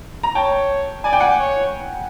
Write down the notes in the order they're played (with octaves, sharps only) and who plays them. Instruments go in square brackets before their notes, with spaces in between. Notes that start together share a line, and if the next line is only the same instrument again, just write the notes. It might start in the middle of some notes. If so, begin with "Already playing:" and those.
[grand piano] A#5
[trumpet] C#5 [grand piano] G5 A5
[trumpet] D5 [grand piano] G#5
[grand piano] G5
F#5 G#5
[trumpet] C#5